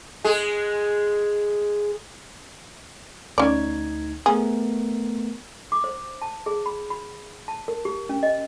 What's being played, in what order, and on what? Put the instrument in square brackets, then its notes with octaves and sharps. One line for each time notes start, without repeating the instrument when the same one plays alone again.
[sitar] G#3 G#4
[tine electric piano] D2 D#4 G#6 [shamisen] C#4 D5
[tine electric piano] A3 B3 A#4 [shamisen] G#4
[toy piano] D6
C5
A5
G#4
B5
B5
A5
A#4
G4
C#4
D#5